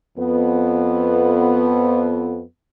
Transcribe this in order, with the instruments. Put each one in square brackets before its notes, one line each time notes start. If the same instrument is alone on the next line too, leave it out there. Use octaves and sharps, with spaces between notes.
[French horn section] F2 B3